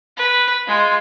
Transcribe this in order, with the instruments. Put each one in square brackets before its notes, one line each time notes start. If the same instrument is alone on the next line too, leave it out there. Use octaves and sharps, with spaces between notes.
[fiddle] B4
G#3 F4